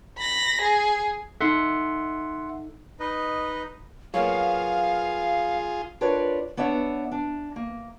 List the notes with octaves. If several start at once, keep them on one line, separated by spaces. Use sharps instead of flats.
B5 A#6
G#4
D#4 A4 E5 F#5 C6
D#4 B4 D#5
F#3 A#3 B3 F4 G#4 F5
D4 F4 A#4 B4 C#5 D5
B3 D4 C#5 E5 F#5
D4
A#3